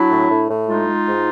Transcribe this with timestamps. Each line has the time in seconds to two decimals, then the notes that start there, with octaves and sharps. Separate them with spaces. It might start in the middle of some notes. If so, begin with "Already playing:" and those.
Already playing: F#3 D4 E4
0.10 A2
0.29 A2
0.49 A2
0.67 G#3 D#4 F4
0.87 G#3
1.06 G#2